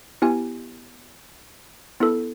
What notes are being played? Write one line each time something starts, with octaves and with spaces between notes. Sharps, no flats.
B3 E4 G4 G#5
B3 E4 A4